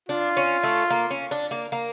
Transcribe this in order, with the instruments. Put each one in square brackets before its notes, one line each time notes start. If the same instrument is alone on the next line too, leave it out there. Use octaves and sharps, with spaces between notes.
[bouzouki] D4 [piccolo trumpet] F4
[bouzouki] C#4
A3
A#3
C#4
D4
A#3
A#3